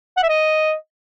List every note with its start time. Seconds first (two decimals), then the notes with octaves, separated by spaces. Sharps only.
0.17 F#5
0.23 E5
0.29 D#5